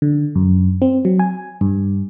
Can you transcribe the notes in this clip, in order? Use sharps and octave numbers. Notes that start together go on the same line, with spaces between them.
D3
F#2
C4
F#3
G#5
G2